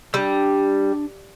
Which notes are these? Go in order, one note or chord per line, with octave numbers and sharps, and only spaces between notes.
G3 D4 D6 E6